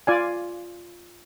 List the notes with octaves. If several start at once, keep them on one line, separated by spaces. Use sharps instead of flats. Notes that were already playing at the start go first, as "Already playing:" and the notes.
F4 D5 G#5